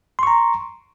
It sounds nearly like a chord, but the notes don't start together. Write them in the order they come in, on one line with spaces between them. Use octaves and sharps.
C6 C#6 A#5